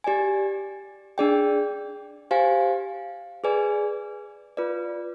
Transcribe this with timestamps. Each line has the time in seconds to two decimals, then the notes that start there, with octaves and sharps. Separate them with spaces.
0.04 G4 D5 G#5
1.18 D4 G#4 D5 G5
2.31 G4 C5 F5 G#5
3.44 G#4 B4 D5 G#5
4.57 F4 B4 D5